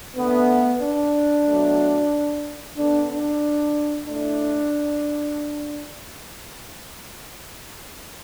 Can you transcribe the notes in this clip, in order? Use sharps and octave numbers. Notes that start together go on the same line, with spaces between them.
D3 A3 B3
D4
B2 F#3 A3
D3 B3 D4
D4
A2 A3 D4